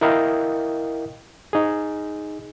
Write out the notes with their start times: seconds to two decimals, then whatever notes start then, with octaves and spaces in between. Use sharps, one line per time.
0.01 E4 A#4 D#5 F5 G5
1.53 D#4 G#4